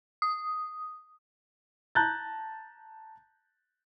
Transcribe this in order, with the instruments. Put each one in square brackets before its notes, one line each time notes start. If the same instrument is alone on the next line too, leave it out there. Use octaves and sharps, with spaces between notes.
[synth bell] D#6
[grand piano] A5 A#5 F#6 G6 A6